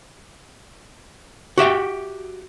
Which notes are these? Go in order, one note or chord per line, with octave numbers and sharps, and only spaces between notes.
F#4 G4 E5 G5